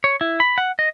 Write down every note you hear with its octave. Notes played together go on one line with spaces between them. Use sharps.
C#5
E4
B5
F#5
D#5